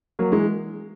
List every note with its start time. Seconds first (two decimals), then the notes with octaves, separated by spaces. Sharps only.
0.19 F#3 A#3
0.32 E3 G#3